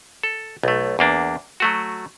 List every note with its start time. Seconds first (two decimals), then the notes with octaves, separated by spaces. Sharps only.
0.23 A4
0.63 B1 A3
0.99 E2 A#3 D4
1.60 F#3 A3 F#4